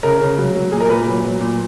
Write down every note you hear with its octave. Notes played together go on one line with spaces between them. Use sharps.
C#3 A#4
C#3
F#3
F#3
A#2 G#4
A#4
A#2 B4
F#3
F#3
A#2